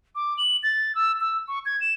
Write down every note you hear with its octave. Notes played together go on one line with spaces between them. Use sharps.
D6
F#7
A6
E6
E6
C#6
G#6
E7